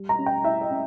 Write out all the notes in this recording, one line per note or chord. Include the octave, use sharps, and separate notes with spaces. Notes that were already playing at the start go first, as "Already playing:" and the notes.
Already playing: G3
A#5
C#4
G5
E4 E5
D#5
C#4